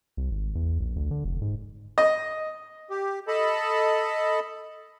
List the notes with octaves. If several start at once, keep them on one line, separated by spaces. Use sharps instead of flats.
C2
G#1
E2
A#1
D2
D3
F1
G#2
D#5
G4
A4 D#5 A5 B5